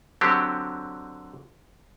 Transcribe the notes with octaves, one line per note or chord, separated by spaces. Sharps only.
D3 F#3 C4 G4